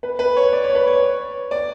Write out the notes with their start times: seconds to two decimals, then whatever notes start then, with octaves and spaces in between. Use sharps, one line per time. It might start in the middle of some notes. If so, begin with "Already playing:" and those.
0.03 B4
0.19 B4
0.37 C#5
0.52 D5
0.64 C#5
0.75 B4
0.87 C#5
1.51 D5